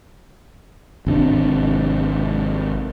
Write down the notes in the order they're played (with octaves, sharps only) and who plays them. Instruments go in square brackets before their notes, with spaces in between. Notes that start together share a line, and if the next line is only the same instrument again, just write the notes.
[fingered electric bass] G#1 C3 C#4 D4